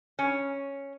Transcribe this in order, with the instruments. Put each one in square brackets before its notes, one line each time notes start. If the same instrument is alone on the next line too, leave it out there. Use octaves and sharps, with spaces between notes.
[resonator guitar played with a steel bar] C#4